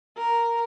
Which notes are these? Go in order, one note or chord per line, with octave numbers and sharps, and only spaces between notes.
A#4